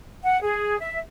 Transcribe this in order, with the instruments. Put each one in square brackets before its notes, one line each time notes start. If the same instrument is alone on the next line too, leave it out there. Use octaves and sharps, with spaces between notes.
[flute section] F#5
G#4
E5